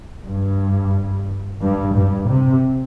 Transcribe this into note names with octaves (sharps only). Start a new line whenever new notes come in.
G2
G2
G2
C3